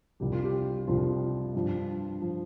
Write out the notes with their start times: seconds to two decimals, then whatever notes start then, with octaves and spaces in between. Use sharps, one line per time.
0.20 C2 C3 F3 G4
0.32 F4
0.44 G4
0.87 C2 C3 F3 F4
1.54 G2 F3
2.22 F3